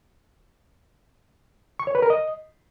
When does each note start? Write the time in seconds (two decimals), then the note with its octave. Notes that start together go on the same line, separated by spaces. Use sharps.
1.80 C#6
1.87 C#5
1.95 B4
2.02 A#4
2.10 D#5